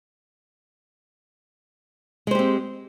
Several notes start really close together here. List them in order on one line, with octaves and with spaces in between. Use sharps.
G#3 C5 G4 C4